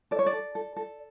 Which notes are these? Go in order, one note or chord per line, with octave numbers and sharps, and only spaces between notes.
A4 D5
C#5
D5
A4
A4
A4